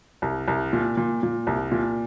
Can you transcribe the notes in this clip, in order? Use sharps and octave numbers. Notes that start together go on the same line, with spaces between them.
C2
C2
A#2
A#2
A#2
C2
A#2